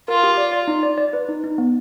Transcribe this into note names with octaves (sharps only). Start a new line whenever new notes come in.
F4 A#4
G4
D5
D5
D#4
D5
D5
B4
D#4
D#4
B3